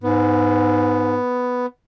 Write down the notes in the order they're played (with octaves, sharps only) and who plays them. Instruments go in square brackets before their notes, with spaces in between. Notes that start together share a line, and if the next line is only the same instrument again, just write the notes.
[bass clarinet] G#2 [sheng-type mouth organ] B3